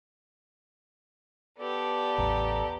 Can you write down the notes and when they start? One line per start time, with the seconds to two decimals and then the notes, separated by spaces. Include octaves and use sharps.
1.58 B3 G4 A4 D5
2.18 A1 E2 A#5